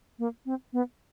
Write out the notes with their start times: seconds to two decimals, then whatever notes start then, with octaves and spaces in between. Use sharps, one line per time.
0.19 A#3
0.46 C4
0.73 B3